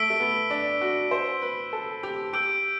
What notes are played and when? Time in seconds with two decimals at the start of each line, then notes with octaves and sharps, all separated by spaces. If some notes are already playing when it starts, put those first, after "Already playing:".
Already playing: A3 E6 B6 D7 G7
0.10 A3
0.20 B3
0.50 D4
0.81 F#4
1.11 C5
1.42 B4
1.73 A4
2.03 G4
2.33 G4 E6 G6 D7